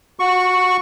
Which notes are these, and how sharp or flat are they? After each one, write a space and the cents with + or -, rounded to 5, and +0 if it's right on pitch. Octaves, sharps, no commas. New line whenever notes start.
F#4 -20 C#6 +0